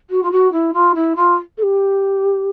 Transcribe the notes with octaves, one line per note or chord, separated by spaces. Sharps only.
F#4
F4
F#4
E4
F4
E4
F4
A4
G4